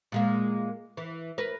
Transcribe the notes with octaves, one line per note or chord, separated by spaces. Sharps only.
A#2 G#3 A#3
E3
A#4 B4